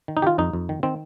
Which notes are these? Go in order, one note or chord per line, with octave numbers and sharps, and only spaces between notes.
D#3
D#4
D#3 F4 G4
F2 D#4
F2
D#3
D#3 C4